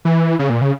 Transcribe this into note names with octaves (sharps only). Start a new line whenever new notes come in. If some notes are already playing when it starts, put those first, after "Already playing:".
E3
C#3
A#2
C#3